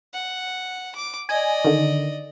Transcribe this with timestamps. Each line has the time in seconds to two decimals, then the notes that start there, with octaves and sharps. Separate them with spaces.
0.13 F#5
0.95 D6
1.29 D5 D#5 G#5
1.65 D3 D#3